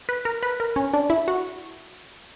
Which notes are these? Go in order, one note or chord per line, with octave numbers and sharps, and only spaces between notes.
B4
A#4
B4
A#4
C#4
D4
E4
F#4